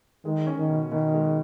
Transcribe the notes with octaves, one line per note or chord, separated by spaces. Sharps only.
D#3 G#3
C#4
D#3
B2
B2 D#3
G#3